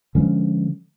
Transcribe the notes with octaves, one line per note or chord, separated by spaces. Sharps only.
D3 F3 G#3 C#4